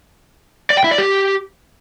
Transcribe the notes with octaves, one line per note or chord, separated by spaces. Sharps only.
D5
G5
E4
D5
G4